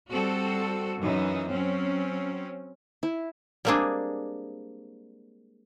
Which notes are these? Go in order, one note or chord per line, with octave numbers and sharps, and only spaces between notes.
G3 C4 F#4 A4
F#2 E3 D#4
F#3 C4 C#4
E4
G3 G#3 A#3 C4 D4 G#4